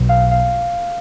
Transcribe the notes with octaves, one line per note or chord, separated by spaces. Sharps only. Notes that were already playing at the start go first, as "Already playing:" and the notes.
Already playing: B1 B2 F#3
F5
F5